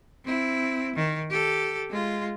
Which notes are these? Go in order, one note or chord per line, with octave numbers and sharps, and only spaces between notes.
C4 E4
D#3
G4 A4
G#3 F4